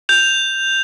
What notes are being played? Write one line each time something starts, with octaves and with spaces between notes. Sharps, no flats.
G6 F7